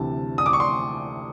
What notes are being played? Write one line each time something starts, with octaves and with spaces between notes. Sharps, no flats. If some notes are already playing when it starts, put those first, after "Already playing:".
Already playing: D2 C3 E3 A5
D#6
D6
C#6
C6